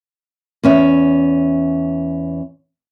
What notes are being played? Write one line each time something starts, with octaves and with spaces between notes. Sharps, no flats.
E2 C#4 E5